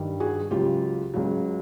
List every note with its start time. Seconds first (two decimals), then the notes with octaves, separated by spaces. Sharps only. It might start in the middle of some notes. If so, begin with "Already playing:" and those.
Already playing: G2 D#3 G3
0.20 F#4 G#4
0.51 C#2 C#3 F#3 F4 G4
1.14 C#2 C#3 F#3